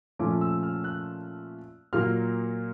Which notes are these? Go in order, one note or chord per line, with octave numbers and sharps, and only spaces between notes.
A#2 F3 A3 C#4 F4 D6
E6
F6
F#6
A#2 F#3 A#3 F6